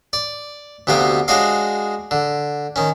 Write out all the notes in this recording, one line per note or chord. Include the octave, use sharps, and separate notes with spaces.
D5
D2 C3 B3 F#4 F5 G5
G#3 D4 F#4 C#5 D#5 F5
D3
D#3 C#4